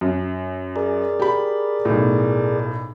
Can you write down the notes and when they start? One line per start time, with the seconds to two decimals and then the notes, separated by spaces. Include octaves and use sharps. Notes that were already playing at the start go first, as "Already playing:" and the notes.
0.01 F#2
0.76 G#4 A#4 D5
1.20 G4 B5
1.85 B1 A2